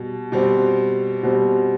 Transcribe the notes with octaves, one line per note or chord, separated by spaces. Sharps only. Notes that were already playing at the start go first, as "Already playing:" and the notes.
Already playing: B2 G3
B2 G3 C4
B2 G3 C4